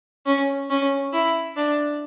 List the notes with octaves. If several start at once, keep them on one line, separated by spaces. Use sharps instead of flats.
C#4
C#4
E4
D4